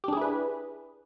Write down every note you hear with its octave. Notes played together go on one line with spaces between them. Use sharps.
D4 E4 G4 G#4 B4